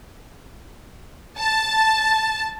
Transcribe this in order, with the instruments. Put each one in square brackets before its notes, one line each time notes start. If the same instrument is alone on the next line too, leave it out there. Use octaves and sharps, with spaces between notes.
[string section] A5